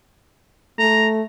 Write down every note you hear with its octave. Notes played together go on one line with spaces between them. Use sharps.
A3 A#5